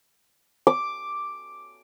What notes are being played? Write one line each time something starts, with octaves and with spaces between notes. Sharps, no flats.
D6